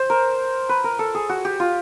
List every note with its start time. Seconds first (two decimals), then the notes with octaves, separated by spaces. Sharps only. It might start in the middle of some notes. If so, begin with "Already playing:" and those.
Already playing: C5
0.10 A#4
0.69 B4
0.84 A#4
0.99 A4
1.15 G#4
1.29 F#4
1.45 G4
1.60 F4